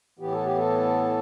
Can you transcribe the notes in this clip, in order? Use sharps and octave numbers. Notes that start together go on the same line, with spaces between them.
A2 E3 B3 G4
A4
G4
A4